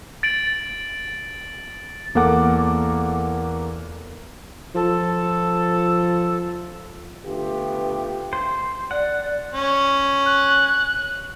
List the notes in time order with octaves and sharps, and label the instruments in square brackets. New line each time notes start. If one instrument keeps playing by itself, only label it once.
[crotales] A6 D7 F#7
[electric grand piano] E2 A#3 A4 F#5 D6
[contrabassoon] F3 [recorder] A4
[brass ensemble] D3 A3 B3 F4 G4
[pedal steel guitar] C5
[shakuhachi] D5 [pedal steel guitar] F#5
[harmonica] C#4
[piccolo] F#6